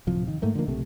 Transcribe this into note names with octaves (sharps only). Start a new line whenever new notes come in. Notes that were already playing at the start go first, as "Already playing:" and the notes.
D1 C3 F3
D#3
G#2 A3 A#3
D3 D#3 F3 A#3
B1 C3 A3